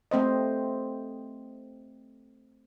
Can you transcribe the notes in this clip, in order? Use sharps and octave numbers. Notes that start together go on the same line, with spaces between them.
A3 C4 C5 D#5